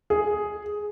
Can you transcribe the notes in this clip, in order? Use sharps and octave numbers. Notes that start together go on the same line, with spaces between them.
G#4